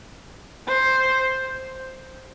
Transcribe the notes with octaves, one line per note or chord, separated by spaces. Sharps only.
C5